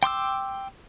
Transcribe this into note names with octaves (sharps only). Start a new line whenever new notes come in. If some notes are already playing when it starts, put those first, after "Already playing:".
G5 C6 D6 E6